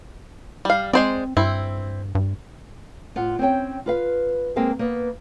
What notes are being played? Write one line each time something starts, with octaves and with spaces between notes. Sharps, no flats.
G3 F5
G#3 C4 C5 D5
G2 C4 E4
G2
A2 F4 F#5
C4 C#4 C#5 G5
F4 B4 F5
G#3 A#3 C4 G#4 A#4 F5
A#3 B3